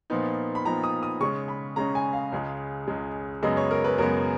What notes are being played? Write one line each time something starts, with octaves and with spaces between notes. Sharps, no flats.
A#2 F3 B3 D#4
B5
A#2 F3 B3 D#4 A#5
D#6
D#6
C#3 G#3 C#4 C#6
B5
C#3 G#3 C#4 A#5
G#5
F5
C#2 C#3 G#3
C#2 C#3 G#3
F#2 C#3 G#3 B3 D#5
C#5
A#4
B4
F#2 C#3 G#3 B3 A#4